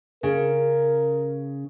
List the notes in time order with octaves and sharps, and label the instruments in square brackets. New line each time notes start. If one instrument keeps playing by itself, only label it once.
[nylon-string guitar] C#3 [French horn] A#4